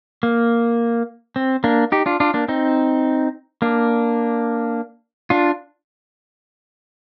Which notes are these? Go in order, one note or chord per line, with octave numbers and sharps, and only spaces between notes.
A#3
C4
A#3 D4
D#4 G4
D4 F4
D4 F4
A#3 D4
C4 D#4
A#3 D4
D4 F4